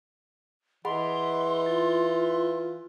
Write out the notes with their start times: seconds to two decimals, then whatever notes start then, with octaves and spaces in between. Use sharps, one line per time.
0.85 E3 G#4 D#5 F#5 B5 C6
1.66 F4 A6